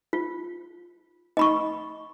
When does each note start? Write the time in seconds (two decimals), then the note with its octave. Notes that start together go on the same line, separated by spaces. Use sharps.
0.13 F4
1.37 D#5 B5 C#6